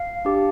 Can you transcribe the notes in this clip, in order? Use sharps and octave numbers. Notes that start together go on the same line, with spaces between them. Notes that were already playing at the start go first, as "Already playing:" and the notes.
Already playing: F5
D4 G4